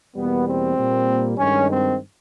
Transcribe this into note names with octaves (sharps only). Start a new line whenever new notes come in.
E2 B2 G3 A#3 B3
C4
A#2 G3 A#3
G2 D#3 G#3 C#4
C4